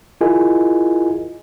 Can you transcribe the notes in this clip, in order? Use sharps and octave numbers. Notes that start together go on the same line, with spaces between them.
E4 F4 G#4 A#4 D#5 G#5